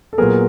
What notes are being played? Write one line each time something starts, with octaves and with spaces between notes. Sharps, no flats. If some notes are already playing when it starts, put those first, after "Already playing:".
A4
A#2 F#3 B3 G#4 A#4